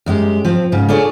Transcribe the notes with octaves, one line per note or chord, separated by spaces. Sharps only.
F#2 G#3 G4
F3 C4
G#2 C#3
D4 F4 G#4 A4 C#5